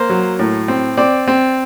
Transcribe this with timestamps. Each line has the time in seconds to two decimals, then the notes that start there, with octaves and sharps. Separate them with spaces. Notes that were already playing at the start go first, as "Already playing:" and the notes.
Already playing: A#3 C5
0.10 F#3
0.39 A2
0.68 C4
0.97 C4 D5
1.28 C4